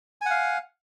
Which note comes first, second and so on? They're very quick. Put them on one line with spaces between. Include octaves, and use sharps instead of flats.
G#5 F#5 F5